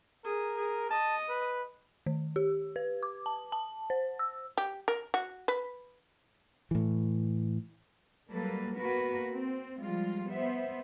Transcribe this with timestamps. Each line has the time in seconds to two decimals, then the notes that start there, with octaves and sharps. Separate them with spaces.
0.24 G#4 A#4
0.57 G#4
0.90 D#5 A5
1.29 B4
2.06 D#3
2.36 G4
2.76 B4
3.03 D6
3.26 A5
3.52 A5
3.90 C5
4.19 E6
4.58 G4
4.88 A#4
5.14 F#4
5.48 B4
6.71 A2 E3
8.29 F#3 G3 A#3 A4 B4
8.77 A#3 B3 F#4 A#4 B4
9.31 C4
9.79 F3 G3 G#3 F4
10.29 B3 C5 E5